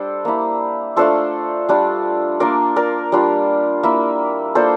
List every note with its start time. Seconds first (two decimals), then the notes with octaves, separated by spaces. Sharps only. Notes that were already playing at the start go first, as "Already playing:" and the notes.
Already playing: G3 D4 A4 C5 D5
0.25 A#3 E4
0.96 A3 D4 F4 A4 C5
1.69 G3 D4 F4
2.40 A#3 D4 F4 A#4 D5
2.76 A#4 D5
3.12 G3 D4 F4
3.83 A#3 E4
4.55 A#3 D4 F4 A4 C5